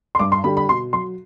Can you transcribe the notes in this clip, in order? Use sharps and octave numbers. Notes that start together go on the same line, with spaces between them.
C6
G2 D6
C6
D3 G3 B5
B5
B2 C6
F#3 C6